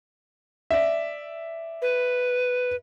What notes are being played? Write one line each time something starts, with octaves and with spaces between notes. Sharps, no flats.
D5 E5
B4